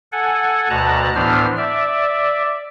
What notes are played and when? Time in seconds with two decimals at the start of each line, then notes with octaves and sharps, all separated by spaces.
0.12 A4 F#5 G#5
0.70 D2 B2 A5 A#5 F#6
1.15 A2 E3 B3 D4 C5 F6
1.57 D5 E5